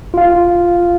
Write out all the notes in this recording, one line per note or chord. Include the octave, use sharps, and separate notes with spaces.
F4 F5